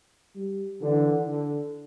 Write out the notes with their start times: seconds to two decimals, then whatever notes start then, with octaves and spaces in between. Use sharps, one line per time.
0.35 G3
0.81 D3 E3
1.27 D3